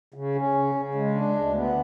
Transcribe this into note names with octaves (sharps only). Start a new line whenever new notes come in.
C#3
C#4
C#3
C#3
G#3
D4
D2
B3